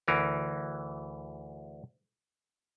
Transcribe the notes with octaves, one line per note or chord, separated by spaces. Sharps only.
D2 E3 A#4